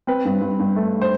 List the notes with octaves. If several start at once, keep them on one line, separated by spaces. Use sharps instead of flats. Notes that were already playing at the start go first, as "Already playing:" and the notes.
C4 B4
G2
G2
G2
A3
C5